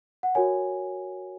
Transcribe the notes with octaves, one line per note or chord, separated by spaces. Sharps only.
F#5
F#4 A#4 C#5 G#5